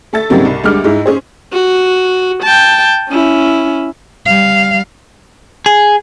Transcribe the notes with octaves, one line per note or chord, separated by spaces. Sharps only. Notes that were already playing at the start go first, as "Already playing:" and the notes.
A3 A4 E5 A6
G#2 C#3 F#3 G3 A#3 C4
C2
D2 G3 G#3 D6 F6
G#2 G#3 E4
C#4 G#4 C5
F#4
G5 A5
C#4 E4
G3 F5
G#4